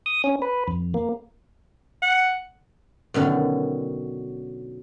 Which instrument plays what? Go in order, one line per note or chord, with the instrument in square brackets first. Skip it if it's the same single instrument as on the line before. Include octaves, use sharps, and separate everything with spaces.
[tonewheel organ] D#6
C#4
B4
F2
A#3
[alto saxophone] F#5
[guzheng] F#2 B2 D3 D#3